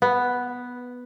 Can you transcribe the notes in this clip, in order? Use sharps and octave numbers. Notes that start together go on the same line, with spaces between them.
B3